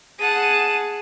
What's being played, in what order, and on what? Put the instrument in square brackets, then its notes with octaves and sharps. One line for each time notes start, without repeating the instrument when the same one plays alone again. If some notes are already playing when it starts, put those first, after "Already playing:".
[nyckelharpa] G#4 A5 [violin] F#5 D#7